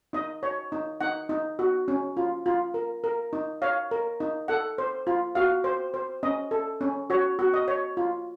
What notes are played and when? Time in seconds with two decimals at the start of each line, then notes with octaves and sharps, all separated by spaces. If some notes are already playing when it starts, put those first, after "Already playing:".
0.13 D#4 D#5
0.43 C#5
0.72 D#4
1.01 D#4 F#5
1.29 D#4
1.59 F#4
1.88 C#4
2.17 F4
2.46 F4
2.74 A#4
3.04 A#4
3.33 D#4
3.62 C#5 F5
3.91 A#4
4.20 D#4
4.48 A4 F#5
4.78 C5
5.07 F4
5.35 F#4 F5
5.64 C5
5.94 C5
6.23 C#4 D#5
6.51 A4
6.81 C#4
7.10 F#4 C#5
7.39 F#4
7.54 D#5
7.68 C#5
7.97 F4